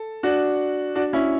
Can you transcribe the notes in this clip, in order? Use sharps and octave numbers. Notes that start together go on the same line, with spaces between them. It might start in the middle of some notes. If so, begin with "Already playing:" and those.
Already playing: A4
D4 F#4
D4 F#4
C#4 E4